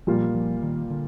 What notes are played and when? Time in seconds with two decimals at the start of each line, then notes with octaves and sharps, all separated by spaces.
0.07 A#2 F3 G3 A#3 F4
0.35 F3
0.63 D#3
0.90 D3